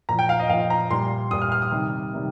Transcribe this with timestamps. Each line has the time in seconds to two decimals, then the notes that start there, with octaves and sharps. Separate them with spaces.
0.09 A#2 F3 A#5
0.19 G5
0.29 F5
0.39 D#5
0.50 A#2 F3 F5
0.70 A#5
0.90 A#2 G3 C6
1.31 A#2 G3 D#6
1.42 F6
1.52 F6
1.62 D#6
1.72 C3 D#3 G3
2.13 C3 D#3 G3